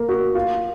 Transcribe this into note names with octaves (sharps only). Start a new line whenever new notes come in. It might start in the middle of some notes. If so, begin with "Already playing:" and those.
Already playing: A#3
F#4
F4